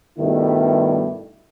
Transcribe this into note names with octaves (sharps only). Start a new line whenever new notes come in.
G2 B2 D#3 G3 A3 E4